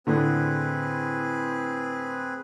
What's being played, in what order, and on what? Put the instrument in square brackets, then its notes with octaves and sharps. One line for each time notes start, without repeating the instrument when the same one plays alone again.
[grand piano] A2 D3 [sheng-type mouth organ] C4 G#4 B4